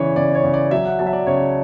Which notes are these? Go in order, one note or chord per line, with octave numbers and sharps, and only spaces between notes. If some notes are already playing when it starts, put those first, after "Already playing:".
Already playing: C#3 E3 C#5 D5
C#3 D5
C#5
C#3
D5
F#3 E5
F#5
F#3 A5
E5
D5
C#3 C#5